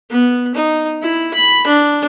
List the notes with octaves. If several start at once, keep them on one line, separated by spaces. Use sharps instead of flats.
B3
D#4
E4
B5
D4